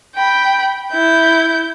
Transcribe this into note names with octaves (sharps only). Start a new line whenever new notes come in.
G5 B5
E4 G6